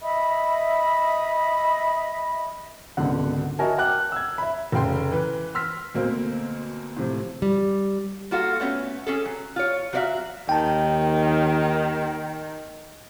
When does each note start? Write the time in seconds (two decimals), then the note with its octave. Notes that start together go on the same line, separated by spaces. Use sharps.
0.02 D#5 E5 B5 D#6
2.97 G#1 C#2 B2 D3 F#5
3.59 F#4 A#4 D#5 E5 G#5 A5
3.78 F#5 G5 A5 D6 F6 F#6
4.12 E6 G#6
4.38 E5 B5
4.72 F1 C#3 G5 C6
5.12 E3 B4
5.55 C6 E6 F6 B6
5.95 D2 B2 A#3 C4
6.97 A2 C3 F3
7.42 G3
8.31 A#3 F4 F#4 A4 F5
8.60 A3 B3 C#4
9.07 C#4 G#4 A4
9.26 F#3
9.56 F4 C#5
9.93 F#3 F#4 C5 D5 E5 F5
10.49 D#2 D#3 G5 A5